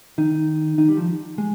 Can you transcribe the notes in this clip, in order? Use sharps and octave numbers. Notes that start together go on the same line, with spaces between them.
D#3 D#4
D#3 D#4
G3
F3
G#3